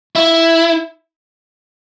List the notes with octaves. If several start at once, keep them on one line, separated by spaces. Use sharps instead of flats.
E4